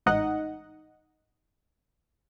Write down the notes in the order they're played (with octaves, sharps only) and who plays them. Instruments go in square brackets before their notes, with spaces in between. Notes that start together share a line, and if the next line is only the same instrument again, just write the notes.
[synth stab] A1 G#2 D#4 D#5 F#5